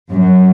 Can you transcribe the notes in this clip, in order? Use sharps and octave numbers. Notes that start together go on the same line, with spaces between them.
F#2